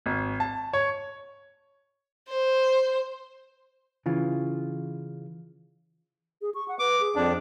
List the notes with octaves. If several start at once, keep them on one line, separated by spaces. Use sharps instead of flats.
G#1
A5
C#5
C5
C#3 E3 F4
G#4
C#6
F#5
B4 D6
G#4
F2 D4